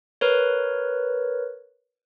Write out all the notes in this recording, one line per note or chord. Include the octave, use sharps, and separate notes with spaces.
A#4 B4 C#5